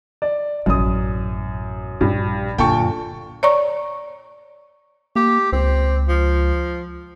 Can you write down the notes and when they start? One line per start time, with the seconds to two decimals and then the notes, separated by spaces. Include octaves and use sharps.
0.22 D5
0.66 A1 F#2 B2 D#6
2.01 A#1 G2
2.58 F#2 A#2 D3 G5 A5 C#6
3.43 C#5 D5 A#5 C#6
5.16 A#3 G4
5.52 C#2 C4
6.08 F3